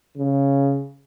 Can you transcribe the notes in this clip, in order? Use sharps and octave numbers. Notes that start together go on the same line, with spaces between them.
C#3